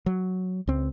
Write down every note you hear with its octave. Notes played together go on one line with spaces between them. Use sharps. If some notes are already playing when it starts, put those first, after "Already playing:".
F#3
C#2 C4